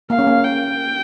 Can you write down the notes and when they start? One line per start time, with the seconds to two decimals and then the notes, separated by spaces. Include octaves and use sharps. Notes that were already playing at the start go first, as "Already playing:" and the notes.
0.10 A#3 F5
0.19 C#4
0.27 A#3
0.44 G5